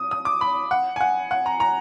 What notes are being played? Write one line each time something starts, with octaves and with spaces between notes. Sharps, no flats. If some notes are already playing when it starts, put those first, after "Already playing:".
Already playing: D#6
D#6
D6
B5
F#5
G#5
F#5
F#5
A#5
A#5